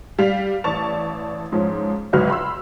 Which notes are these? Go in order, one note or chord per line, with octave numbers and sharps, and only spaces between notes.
G3 F5 B6 F7
A1 D5 A5 C#6 A6 F7
G#2 F3 C#4
G1 C#2 G#2 F#3 B4 F6
B5 C6 E6